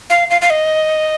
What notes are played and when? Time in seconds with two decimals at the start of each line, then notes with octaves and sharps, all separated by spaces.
0.10 F5
0.30 F5
0.42 F5
0.50 D#5